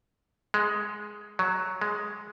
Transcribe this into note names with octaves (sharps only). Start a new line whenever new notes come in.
G#3
F#3
G#3